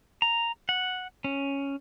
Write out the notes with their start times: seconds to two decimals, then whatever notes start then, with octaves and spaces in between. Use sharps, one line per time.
0.22 A#5
0.69 F#5
1.24 C#4